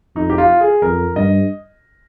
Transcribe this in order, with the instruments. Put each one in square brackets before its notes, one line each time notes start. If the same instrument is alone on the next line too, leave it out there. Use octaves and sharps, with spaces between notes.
[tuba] F2 [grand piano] D#4
[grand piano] G4
F4
G#4
[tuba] F2 [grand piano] A#4
[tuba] G2 [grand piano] D#5